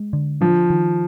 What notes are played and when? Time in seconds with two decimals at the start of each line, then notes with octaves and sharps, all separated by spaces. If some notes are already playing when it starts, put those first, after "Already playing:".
Already playing: G#3
0.13 D3
0.41 F3 D4
0.70 D#3